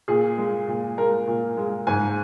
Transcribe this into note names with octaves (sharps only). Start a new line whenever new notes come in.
A#2 G#4
G#3
A#2
G#3 A#4
A#2
G#3
G#2 G#5